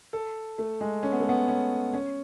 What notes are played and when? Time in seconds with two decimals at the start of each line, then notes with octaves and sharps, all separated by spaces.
0.13 A4
0.58 A3
0.81 G#3
1.03 C#4
1.12 B3
1.20 A3
1.29 B3
1.48 C#4
1.93 C#4